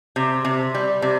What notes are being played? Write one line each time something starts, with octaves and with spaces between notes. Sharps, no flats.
C3
C3
G3
C3